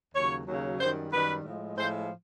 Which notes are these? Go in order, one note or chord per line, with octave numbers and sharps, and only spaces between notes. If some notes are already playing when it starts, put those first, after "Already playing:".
D#2 C#3 F#3 C#5
D#2 C#3 F#3
F#2 D#3 G3 C5
F#2 D#3 G3 B4
A2 F3 G#3
A2 F3 G#3 C5